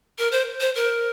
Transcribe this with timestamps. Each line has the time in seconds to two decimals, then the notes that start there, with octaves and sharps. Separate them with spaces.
0.19 A#4
0.32 C5
0.60 C5
0.75 A#4